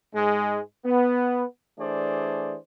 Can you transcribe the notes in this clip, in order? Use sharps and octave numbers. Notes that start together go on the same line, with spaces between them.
G#2 G#3
B3
E3 A3 D4 G#4 C5 D5